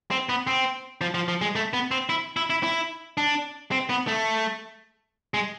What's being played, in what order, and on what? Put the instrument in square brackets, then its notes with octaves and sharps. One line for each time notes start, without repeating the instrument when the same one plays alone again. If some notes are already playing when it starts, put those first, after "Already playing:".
[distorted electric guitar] C4
B3
C4
F3
F3
F3
G#3
A3
B3
C4
E4
E4
E4
E4
D4
C4
B3
A3
G#3